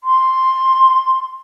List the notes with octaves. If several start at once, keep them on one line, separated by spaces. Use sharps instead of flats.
C6